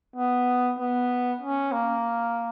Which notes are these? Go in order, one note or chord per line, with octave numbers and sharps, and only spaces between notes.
B3
B3
C#4
A#3